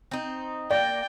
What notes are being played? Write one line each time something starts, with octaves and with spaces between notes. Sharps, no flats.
C4 D#4
A#3 D5 G5